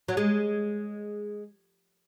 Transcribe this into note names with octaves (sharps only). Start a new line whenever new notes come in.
F#3
G#3